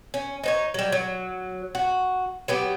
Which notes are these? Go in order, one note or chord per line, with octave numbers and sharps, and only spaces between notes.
C#4
D#4 C5 C#5
F#3 G3
F#3
F#4
F#3 B3 G4